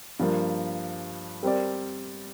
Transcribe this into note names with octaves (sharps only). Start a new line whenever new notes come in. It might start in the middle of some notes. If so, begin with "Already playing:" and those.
G2 F3 A#3
G3 C4 A#4 D5